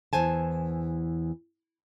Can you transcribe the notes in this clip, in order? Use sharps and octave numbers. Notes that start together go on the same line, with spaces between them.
E2 E3 C5 G#5 A5